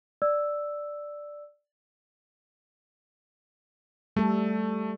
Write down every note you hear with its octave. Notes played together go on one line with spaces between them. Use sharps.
D5 E6
G3 A3 A4